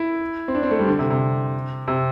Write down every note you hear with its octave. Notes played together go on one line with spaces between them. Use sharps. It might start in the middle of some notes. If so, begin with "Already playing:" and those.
Already playing: E4
C4
D4
C4
A3
G3
D3
C3
C3
C3